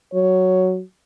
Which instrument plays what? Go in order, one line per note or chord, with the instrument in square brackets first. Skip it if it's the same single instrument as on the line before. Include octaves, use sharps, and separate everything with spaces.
[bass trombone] F#3 [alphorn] C#5